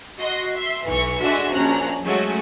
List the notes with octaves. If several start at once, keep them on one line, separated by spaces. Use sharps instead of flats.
F#4 D#5 C6
E5 C6
B1 E3 C#6
G#3 D4 F#4 A4 E5
A#1 C#4 A#5 F#6
F#3 G#3 A3 C#4 F#4